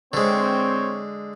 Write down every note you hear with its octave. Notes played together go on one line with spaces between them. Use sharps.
D3 G#3 C4 C#5